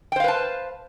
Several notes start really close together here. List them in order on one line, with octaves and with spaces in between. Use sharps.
G5 C5 F5 B4 A5